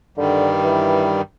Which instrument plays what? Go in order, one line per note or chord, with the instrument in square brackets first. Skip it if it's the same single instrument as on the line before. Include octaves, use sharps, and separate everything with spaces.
[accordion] G2 D#3 G3 [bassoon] D3
[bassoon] E3